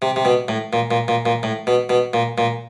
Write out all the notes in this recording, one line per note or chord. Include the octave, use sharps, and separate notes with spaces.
C3
C3
B2
A2
A#2
A#2
A#2
A#2
A2
B2
B2
A#2
A#2